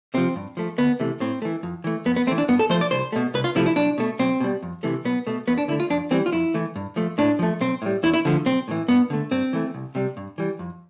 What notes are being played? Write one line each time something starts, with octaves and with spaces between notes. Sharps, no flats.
C3 F3 C4
G2
F3 A3
D2 B3
C3 E3 A3
A2 C4
E3 A3
F2
E3 A3
F2 B3
B3
E3 A3 C4
D4
G2 B3
A4
F3 A3 C5
D5
C2 C5
B2 A3
C2 B4
F4
C3 F3 A3 E4
E4
B1 D4
B2 A3
B1 C4
B2 G3
F2
C3 E3 A3
B1 B3
B2 A3
E2 B3
D4
D3 A3 E4
F4
F2 D4
E3 G3 C4
F4
F2 E4
E3 A3
G2
F3 A3
A2 D4
F3 A3
B1 C4
A2 G3
E2 E4
E4
D3 F3 A3
B1 C4
A2 E3
G2 B3
D3 A3
G2 C4
E3 A3
C2
C3 G3
G2
E3 G3
F2